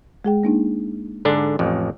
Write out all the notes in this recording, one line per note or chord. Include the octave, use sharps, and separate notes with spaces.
G#3 G#4 G5
A#3 D4 D#4
G#2 D3 D4 A4
A1 F2